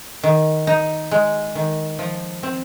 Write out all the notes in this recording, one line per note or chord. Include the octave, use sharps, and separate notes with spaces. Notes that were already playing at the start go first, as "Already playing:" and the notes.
D#3
D#4
G#3
D#3
F3
C4